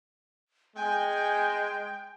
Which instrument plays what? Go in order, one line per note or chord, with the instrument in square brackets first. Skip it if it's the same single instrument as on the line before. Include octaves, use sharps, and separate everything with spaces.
[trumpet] G#3 [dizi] G5 [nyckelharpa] G#5